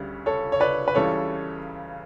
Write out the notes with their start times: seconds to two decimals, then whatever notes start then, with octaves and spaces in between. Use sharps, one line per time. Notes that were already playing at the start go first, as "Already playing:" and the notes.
Already playing: D2 C#3 G3
0.26 A4 C#5
0.52 C#5
0.60 B4 D5
0.88 B4
0.95 C#2 C#3 E3 G3 A4 C#5